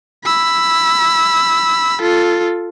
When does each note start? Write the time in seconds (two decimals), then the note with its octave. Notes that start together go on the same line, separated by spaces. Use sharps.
0.24 B5 E6
2.01 F4 A4